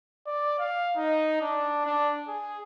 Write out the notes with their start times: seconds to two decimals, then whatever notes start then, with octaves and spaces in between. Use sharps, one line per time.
0.27 D5
0.60 F5
0.97 D#4
1.42 D4
1.86 D4
2.28 G#4